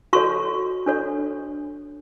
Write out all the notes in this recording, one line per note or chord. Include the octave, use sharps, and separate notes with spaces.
F#4 A4 C#5 C#6
D4 A4 C#5